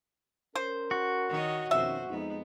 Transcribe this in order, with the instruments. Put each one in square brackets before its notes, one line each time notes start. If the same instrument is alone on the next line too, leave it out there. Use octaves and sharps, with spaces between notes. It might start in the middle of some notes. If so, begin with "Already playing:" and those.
[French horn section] C#4 A#4 [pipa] C5
[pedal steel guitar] F#4
[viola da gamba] D#3 C#5 D#5
[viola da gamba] F2 B2 C5 [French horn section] D#3 C#4 [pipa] E5
[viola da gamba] F2 B3 [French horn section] G#3 D#4